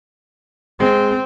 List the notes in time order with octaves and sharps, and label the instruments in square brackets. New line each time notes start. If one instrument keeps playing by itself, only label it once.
[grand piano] G#3 [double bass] C4